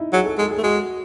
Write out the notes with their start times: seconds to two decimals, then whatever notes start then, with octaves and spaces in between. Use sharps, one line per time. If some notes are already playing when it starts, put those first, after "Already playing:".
Already playing: D#4 E4
0.13 F#3 G#4
0.25 A4
0.38 G#3 A4
0.51 G#4
0.58 A3
0.64 G#3 F#4